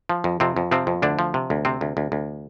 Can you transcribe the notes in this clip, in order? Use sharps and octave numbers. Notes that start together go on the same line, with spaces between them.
F3
F2
F2 C3 C4
F2
C3 F3 C4
F2
D2 D3 D4
F3
C3
D2
C3 C4
D2
D2
D2